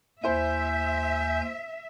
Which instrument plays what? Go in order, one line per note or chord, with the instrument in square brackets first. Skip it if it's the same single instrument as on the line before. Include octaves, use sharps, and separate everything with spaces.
[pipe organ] D#2 G#5 G6 [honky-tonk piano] E4 C5 [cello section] E5